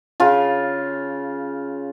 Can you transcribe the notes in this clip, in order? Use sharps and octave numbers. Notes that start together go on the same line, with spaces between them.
C#3 F4